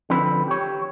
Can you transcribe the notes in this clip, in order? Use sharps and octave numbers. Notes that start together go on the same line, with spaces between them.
D3 F3 C4 B4
G4 C#5